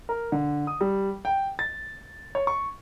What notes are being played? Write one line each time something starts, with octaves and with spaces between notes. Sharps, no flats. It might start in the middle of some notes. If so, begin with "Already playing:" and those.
A#4
D3
D#6
G3
G5
A6
C#5
C#6